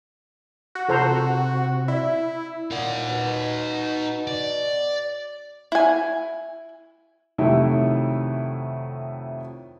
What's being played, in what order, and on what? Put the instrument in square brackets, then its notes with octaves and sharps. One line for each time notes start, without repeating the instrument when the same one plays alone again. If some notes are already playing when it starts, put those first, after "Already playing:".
[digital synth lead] F#4
[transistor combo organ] C3 [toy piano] D#4 F4 G#4 [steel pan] A4 C5 A#5
[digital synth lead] E4 [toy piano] D5
[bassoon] A#2 [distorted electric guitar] D#4 F#5
[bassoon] B2
[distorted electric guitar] D5
[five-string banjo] E4 G#5
[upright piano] F2 C3 D#3 F#3 A3 E4